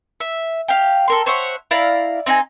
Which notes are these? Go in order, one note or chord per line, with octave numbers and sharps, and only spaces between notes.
E5
G4 F5
A4 A#4 C6
C5 C#5 E5 F#5
E4 D5 F5 A#5
C4 D#4 F#4 G#4